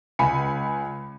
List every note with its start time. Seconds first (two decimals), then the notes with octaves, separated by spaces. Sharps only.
0.19 C#2 G#5 B5 C#7